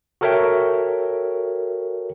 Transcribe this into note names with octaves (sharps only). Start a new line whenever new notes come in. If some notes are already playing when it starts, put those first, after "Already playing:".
F#4 A4 A#4 C#5 E5 G5